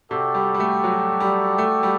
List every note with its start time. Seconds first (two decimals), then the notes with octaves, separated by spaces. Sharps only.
0.10 C3 F#4 A4 D5 G5
0.35 G3
0.54 G3
0.60 A3
0.84 F#3
1.20 G3
1.58 A3
1.83 G3